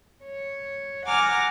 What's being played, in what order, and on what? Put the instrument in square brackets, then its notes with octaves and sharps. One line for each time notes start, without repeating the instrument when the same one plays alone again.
[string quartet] C#5
F#5 G#5 A#5 D6 F6